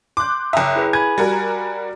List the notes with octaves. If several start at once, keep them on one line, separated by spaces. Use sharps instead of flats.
C6 D6 F#6 G6
F#1 E5 G5 A#5 D#6
E4 G#4 B4
G#5 B5 G#6
G3 F#4 A#4